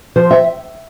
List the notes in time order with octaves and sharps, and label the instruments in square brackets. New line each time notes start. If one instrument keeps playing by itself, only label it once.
[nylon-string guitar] F3 C5
E5